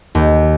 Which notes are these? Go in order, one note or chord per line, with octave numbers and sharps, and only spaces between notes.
D#2